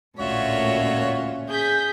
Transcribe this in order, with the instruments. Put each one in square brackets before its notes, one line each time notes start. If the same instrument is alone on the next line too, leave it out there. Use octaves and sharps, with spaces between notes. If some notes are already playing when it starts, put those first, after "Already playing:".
[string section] A1 D2 A#2 [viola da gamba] C#4 [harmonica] F4 F#4 C#5 [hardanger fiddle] E5
[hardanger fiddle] G#4 [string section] G6 B6